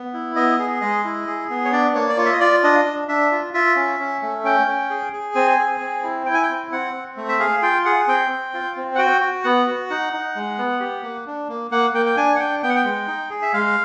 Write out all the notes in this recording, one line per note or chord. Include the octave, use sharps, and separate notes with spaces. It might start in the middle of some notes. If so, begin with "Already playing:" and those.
Already playing: B3
E4
B3 D#5
G#4
G#3 D#5
E4
G#4
B3
C#5
D4 D5
A#3 C#5
D5
F4 C#5
E5
D#5
F4 D5
D4 D#5
D4
D4 E5
F4
F4 E5
C#4
C#4
A3
C#4 G5
C#4
G#4
G#4
C4 G#5
G#4
C4
E4
E4 G5
G#5
G5
C4
C4 F#5
C4
A3
E5
G#4 F5
F4 G5
G#4 F#5
C4 G5
C4
F4
C4
F#5
F#4 G5
F#4
B3 F#5
F#4
D#4 F#5
D#4
G#3
B3
G4
A#3
D4
A#3
A#3 F#5
A#3 G5
G5
D4 G#5
F#5
D4 G5
B3 G5
F#5
G5
G#3
D#4
G#4
E5
G#3 F5